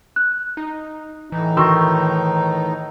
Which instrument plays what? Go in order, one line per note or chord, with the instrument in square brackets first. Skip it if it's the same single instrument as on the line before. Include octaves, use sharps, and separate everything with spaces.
[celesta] F#6
[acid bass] D#4
[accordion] A2 D#4 [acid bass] E3
[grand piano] D#3 C6 E6 [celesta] F#4 C#6 A#6